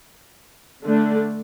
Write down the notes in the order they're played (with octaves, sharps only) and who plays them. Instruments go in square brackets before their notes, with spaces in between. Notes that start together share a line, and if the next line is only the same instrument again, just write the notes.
[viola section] D3 A3 D4